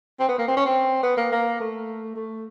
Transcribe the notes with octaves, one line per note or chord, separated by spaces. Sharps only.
C4
B3
A#3
C4
C#4
C4
B3
A#3
A#3
A3
A3